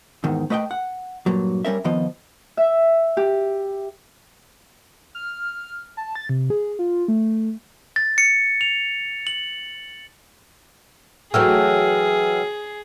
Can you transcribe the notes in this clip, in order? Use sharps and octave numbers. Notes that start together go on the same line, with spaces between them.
E2 G#2 D#3
A3 B4 D#5 F5 G5
F#5
G2 A#2 F#3
G3 C#4 A#4 E5
F2 D#3 F3 B3 D#5
E5
G4
F6
A5
A6
C3
G#4
F4
A3
A6
C#7
F7
F#7
E3 F#3 A3 G#4 G5 E6 F6